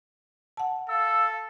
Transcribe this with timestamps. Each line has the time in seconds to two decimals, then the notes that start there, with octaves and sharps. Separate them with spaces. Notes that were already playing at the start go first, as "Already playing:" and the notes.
0.57 F#5 A5
0.89 A4 F5 E6